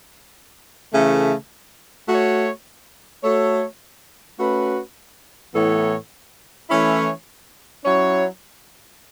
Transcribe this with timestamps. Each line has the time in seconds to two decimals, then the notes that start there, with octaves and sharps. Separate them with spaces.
0.93 C#3 E3 A3
2.08 A3 F#4 C#5
3.24 A3 F#4 A4 C#5
4.39 A3 C#4 F#4 B4
5.54 A2 E3 B3 A4 C#5
6.70 E3 A3 C#4 E4 C#5
7.84 F#3 C#4 E4 C#5